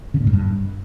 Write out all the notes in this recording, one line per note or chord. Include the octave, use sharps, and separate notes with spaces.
C#3
A#2
G#2
G2